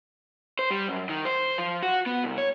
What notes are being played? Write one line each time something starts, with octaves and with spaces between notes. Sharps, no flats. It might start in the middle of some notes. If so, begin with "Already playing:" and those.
C5
G3
F#2
D#3
C5
F3
F#4
B3
C2
C#5